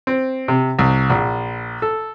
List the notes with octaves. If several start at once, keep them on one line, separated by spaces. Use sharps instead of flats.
C4
C3
C2
A#1
A4